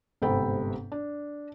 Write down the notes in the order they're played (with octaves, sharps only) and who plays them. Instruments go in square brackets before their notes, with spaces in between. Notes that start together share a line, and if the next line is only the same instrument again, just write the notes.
[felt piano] G1 G#2 C3 A4 G5 B5
D4